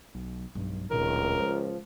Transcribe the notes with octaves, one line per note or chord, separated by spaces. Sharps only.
B1
B1 G2 G#3
D1 C#2 A#2 D#3 A#4
F3 G#3